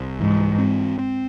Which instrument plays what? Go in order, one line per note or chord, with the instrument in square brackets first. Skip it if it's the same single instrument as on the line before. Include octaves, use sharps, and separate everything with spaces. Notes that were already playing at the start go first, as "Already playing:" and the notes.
Already playing: [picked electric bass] C2
[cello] G#2 [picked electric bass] E3
[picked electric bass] C4
C4